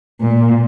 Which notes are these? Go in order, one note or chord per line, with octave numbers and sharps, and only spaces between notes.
A#2